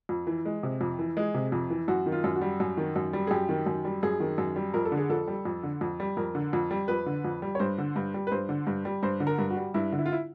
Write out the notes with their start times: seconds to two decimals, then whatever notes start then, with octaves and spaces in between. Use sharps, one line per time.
0.09 F2
0.27 E3
0.45 G#3
0.63 C3
0.81 F2
0.99 E3
1.17 G#3 G#4
1.34 C3
1.52 F2
1.70 E3
1.88 F#2 F#4
2.06 D#3
2.12 F4
2.24 F#2
2.36 F#4
2.41 G3
2.60 F#2
2.77 D#3
2.96 F#2
3.13 G3
3.27 G#4
3.31 F#2 G4
3.49 D#3
3.66 F#2
3.85 G3
4.03 F#2 G#4
4.20 D#3
4.38 F#2
4.56 G3
4.74 F2 A#4
4.85 A4
4.92 D3
4.97 G#4
5.10 F2 A4
5.27 G3
5.45 F2
5.63 D3
5.81 F2
6.00 G3
6.17 F2 A#4
6.35 D3
6.53 F2
6.71 G3
6.88 F2 B4
7.06 D3
7.25 F2
7.42 G3
7.55 C#5
7.59 G2 C5
7.78 D3
7.96 G2
8.14 G3
8.27 B4
8.32 G2 C5
8.49 D3
8.67 G2
8.85 G3
9.03 G2 C5
9.20 D3
9.27 A#4
9.39 G2
9.50 F#4
9.57 G3
9.74 G2 E4
9.92 D3
9.99 E4
10.06 F4
10.12 E4